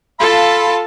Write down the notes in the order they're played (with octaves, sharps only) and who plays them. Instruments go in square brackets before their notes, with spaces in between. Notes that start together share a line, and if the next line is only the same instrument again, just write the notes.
[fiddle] F4 A5 [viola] A4 [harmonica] F5 B5 C6